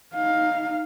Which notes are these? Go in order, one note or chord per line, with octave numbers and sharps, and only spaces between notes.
D#4 F5